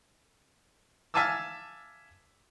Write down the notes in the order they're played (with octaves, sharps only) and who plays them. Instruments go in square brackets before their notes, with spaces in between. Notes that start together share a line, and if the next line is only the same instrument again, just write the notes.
[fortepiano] E5 F5 G#5 A5 D6 E6